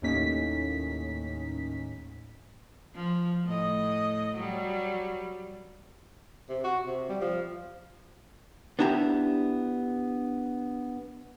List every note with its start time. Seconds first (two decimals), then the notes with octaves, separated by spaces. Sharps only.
0.02 D#2 A2 A#3 C#4 D#4 B6
2.95 F3
3.45 A2 D#5
4.34 F#3 G3
6.49 C3
6.64 F#4
6.86 C3
7.09 G3
7.21 F3
8.79 B3 D4 E4 G4 A#5